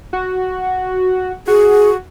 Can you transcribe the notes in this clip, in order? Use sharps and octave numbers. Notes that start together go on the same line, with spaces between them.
F#4
F#4 G#4